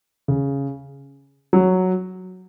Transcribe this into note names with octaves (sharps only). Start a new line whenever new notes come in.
C#3
F#3